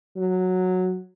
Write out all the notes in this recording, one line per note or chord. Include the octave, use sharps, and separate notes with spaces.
F#3